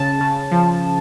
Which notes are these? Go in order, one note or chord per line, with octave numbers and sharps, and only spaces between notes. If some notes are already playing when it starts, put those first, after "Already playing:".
Already playing: C#3 A5
C#3
F3